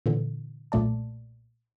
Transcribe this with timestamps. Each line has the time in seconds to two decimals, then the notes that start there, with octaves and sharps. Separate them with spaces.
0.06 A#2 D3 E3
0.72 B1 A#2 A3 D5 A5